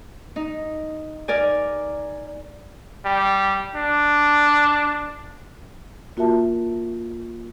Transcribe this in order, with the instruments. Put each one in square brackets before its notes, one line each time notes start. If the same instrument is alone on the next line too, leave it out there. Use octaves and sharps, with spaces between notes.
[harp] D#4
A#4 D5 G#5
[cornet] G3
D4
[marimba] A#3 F4 F#4 A#4 E5 A5